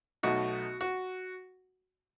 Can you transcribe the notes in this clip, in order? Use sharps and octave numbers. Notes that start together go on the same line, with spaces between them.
B1 B2 A3 D#4 F#4
F#4